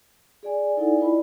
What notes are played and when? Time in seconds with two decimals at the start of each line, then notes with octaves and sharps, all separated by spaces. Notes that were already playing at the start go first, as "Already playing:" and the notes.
0.43 G#4 D5 G#5
0.77 D#4 E4 A4 D5 F#5 G#5
1.00 E4 F4 B4 D5 D#5 B5